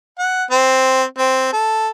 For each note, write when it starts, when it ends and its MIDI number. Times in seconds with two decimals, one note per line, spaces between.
0.19 0.44 78
0.51 1.04 60
1.18 1.52 60
1.53 1.88 69